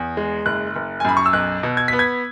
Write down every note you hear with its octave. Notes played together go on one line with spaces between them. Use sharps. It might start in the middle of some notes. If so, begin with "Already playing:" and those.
Already playing: E2
G#3
F#1 F#6
F#1
G#5
F#2 B5
C#6
E6
B1 F#6
B2
G#6
B3 B6
G#6